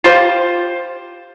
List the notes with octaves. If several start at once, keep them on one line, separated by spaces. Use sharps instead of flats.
F4 G4 C5